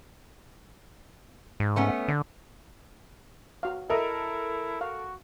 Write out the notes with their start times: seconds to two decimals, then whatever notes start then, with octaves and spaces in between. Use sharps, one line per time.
1.60 G#2
1.76 A3 B3 C#4
2.08 D3
3.63 F#4 F5
3.90 E4 A4 A#4 D#5 E5
4.81 F#4 F5